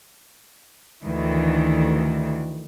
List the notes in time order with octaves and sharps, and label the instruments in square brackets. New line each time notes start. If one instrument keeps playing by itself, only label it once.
[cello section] D2 D#3 E3